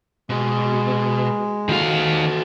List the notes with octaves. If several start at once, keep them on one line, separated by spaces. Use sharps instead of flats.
B2 G#3
D#3 F#4 A4 F5